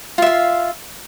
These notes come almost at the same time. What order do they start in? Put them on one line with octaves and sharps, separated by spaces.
F4 E5 F5